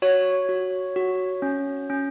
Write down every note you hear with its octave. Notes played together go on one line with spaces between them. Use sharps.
F#4 C#5
F#4
F#4
C#4
C#4